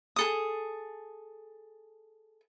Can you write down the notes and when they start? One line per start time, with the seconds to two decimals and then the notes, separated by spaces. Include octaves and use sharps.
0.16 G#4 A4 D#6